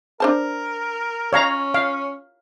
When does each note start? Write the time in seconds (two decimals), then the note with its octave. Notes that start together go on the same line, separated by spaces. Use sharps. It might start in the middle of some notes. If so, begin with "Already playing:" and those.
0.20 D4 A#4 C5 A5
1.33 C#4 C#5 F5 A#5
1.74 F5